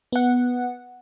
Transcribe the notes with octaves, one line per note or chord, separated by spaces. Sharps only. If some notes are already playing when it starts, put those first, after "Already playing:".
B3 F#5